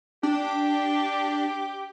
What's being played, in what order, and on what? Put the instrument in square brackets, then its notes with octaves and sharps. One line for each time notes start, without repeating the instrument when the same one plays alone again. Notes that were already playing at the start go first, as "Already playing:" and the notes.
[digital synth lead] D4 [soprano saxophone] G4